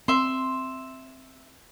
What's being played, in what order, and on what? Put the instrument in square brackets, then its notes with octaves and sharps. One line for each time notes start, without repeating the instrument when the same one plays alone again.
[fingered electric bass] C4 [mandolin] E5 C6